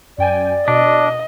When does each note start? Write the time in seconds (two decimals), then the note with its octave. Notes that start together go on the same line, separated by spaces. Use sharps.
0.18 F#2 D5 G5 G#5
0.68 B2 D4 D#5